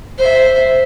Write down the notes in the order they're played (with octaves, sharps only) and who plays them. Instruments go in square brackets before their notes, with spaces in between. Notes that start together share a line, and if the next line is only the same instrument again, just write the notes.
[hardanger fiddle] C5 E5